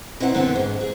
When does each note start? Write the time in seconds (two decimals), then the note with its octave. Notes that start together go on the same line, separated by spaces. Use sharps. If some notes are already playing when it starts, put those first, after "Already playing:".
0.20 B2 C4 E4 F#5 A#5
0.34 F#2 D3 B3 C4
0.56 G#2
0.81 G#4